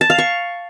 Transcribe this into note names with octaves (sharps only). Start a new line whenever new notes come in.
A5
F5
C#6